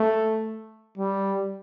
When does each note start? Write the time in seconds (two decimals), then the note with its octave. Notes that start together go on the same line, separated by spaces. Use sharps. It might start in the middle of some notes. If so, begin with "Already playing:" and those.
Already playing: A3
0.98 G3